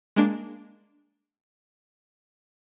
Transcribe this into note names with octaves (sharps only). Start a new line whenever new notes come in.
G#3 A#3 D4